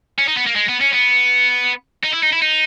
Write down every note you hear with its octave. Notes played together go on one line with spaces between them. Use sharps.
C#4
D#4
B3
A#3
G#3
B3
C#4
B3
D#4
E4
D#4
E4
D#4